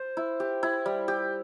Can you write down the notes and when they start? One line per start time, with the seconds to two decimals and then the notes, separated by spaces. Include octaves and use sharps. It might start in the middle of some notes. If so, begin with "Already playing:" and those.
Already playing: C5
0.17 E4
0.40 G4
0.63 E4
0.86 G3
1.08 G4